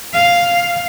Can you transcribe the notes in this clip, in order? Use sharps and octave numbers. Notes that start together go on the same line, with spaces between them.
F5